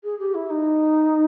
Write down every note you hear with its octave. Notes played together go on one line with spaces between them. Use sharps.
G#4
G4
E4
D#4